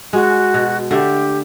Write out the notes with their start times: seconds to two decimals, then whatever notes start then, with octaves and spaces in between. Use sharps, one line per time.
0.13 G#3 F#4
0.54 B2
0.91 D3 A3 G4